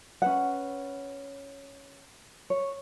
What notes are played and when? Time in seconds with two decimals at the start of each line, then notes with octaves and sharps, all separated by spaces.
0.22 C#4 B4 F#5
2.50 C#5